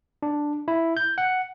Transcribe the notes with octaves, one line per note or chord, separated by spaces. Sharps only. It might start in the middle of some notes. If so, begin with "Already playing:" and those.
D4
E4
G6
F#5